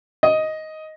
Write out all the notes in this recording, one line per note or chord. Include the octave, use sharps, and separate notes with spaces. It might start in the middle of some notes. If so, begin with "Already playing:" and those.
D#5